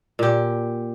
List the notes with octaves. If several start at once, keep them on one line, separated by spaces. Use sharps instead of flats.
A#2 G4